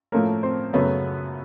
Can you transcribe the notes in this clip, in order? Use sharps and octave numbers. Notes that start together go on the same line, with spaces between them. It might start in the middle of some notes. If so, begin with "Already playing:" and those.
A2 F3 A3 A#3 C#4 A#4
C4 C5
F#2 C#3 F#3 A3 B3 C#4 B4